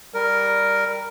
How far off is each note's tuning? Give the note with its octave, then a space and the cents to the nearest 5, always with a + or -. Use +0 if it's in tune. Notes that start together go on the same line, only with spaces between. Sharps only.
G3 +0 A#4 +0